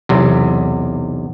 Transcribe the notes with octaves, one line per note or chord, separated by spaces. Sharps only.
B1 E2 C3